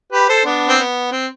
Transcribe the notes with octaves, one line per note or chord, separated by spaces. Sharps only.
G4 B4
A4 C5
B3 D4
C4
B3
C4